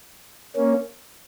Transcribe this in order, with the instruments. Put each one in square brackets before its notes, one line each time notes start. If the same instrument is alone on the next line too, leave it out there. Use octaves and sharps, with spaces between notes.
[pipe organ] A#3 C#4